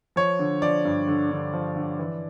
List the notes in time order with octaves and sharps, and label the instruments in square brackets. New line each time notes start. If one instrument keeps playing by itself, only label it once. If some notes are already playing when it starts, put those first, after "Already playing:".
[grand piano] F3 C#5
D3
F3 D5
G2
D3
D3
F3
D3
E3